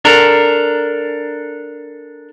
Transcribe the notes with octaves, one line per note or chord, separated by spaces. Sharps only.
D4 A4 A#4